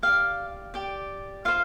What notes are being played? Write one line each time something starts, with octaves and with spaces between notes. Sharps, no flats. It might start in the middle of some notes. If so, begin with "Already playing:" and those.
G4 D5 F5
G4 D5
F4 C5 F5